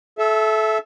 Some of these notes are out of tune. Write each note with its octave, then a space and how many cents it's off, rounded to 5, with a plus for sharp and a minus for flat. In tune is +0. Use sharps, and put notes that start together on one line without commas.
A4 -25 E5 +0